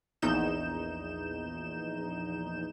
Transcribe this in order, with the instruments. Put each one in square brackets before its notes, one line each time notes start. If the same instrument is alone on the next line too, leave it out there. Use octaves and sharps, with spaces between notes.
[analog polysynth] A#1 E2 D#4 G6 E7